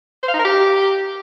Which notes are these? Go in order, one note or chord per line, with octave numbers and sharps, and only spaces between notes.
C5
F5
D#4
A#4
G4